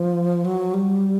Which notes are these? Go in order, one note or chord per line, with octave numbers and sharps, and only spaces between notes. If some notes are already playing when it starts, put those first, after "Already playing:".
Already playing: F3
F#3
G3